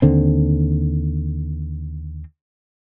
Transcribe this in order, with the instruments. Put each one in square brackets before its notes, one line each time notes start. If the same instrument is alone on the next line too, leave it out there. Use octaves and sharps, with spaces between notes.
[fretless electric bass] D#2 D3 C4